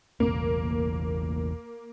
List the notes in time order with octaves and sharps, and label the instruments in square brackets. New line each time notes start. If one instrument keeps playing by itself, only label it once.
[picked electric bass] E1 A1 E2 [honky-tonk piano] A#3